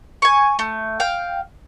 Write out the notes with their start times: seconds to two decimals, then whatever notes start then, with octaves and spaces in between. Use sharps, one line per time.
0.22 G#5 C#6
0.59 A3
1.00 F5 G5